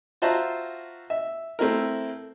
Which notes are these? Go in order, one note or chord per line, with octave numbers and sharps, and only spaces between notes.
F4 F#4 C5 E5 A5 A#5
E5
A3 C4 E4 A#4